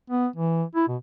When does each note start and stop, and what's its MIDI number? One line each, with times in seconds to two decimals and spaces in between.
0.10 0.27 59
0.36 0.63 52
0.75 0.86 64
0.88 0.97 47